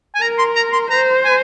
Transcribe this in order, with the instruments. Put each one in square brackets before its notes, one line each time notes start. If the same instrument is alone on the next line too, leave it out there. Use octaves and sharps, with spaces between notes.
[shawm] G#5
[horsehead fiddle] A#4 [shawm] A#5
[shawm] C6
A#5
C6
[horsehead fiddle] C5 [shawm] A#5
[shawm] G#5